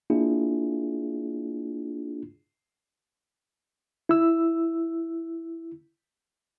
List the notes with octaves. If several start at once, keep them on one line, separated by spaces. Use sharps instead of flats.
A#3 D4 E4 F4 G#4
E4 E6